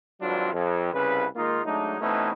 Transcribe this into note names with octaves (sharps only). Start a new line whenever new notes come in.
G#1 G2 F#3 C4 D4 F4
F2
C2 C#3 B4
D#3 G#3 A#3 D#4 F4
F#3 G#3 A3 D4 D#4
B2 E3 A3 C4 C#4 D#4